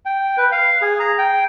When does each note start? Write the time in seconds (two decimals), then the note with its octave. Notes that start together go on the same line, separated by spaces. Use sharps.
0.06 G5
0.37 B4
0.52 F5
0.82 G#4
1.00 A#5
1.18 G5